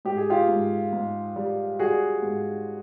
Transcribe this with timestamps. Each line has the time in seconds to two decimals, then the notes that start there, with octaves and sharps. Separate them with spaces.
0.05 G#2 G4
0.17 G#4
0.30 F4 G4
0.49 G#2
0.93 G#2
1.36 G3
1.79 G3 F#4 G#4
2.22 G#2